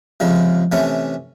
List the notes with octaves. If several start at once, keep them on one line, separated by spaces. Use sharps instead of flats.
C#2 C3 F3 G#3
C3 E3 A3 C#4